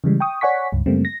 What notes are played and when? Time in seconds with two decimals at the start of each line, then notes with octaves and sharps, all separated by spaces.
0.04 C#3 E3 G3 G#3
0.20 G5 C#6 D#6
0.41 C#5 D5 F#5 G#5 C#6 B6
0.72 C#2 G2
0.86 F#2 C#3 G3 A3 A#3 C4
1.05 A#6